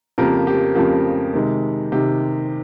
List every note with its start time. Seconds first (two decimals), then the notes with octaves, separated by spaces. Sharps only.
0.18 F2 C#3 F3 A#3 G4 A#4
0.47 G4
0.75 F2 C#3 F3 A#3 G4
1.34 C3 D#3 G#3
1.92 C3 D#3 G4